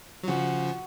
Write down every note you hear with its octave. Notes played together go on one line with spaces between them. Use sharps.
F#3
C#3 F3 F#4